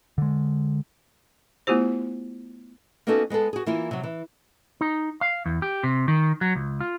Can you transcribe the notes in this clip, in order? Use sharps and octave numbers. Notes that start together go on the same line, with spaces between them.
D3 G#3
A3 B3 E4 F4 G4 C5
A#3 B3 C#4 D#4 F#4 A4
G#3 B3 G#4 A4
F#4 G#4
E3 A#3 E4 F4
C3 F#3
E3
D#4
F5
E2
G4
C3
D#3
F#3
C#2
F4